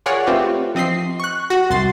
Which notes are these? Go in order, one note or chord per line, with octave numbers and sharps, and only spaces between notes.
F4 G#4 A#4 C#5 D5 F#5
A3 C4 F4 G4 B4
F3 C4 D#5 B6 C7
C#6 F#6
F#4
C2 C6 A6 C7